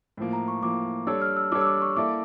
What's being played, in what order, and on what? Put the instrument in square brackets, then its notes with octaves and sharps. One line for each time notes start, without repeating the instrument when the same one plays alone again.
[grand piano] A2 F3 A#3
[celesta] A#5
C#6
[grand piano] A2 F3 A#3 [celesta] D6
[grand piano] G3 D4 A4 C#5 [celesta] E6
[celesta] F6
E6
[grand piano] G3 D4 A4 C#5 [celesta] D6
[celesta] E6
D6
C#6
[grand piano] A#3 E4 A4 D5 [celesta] D6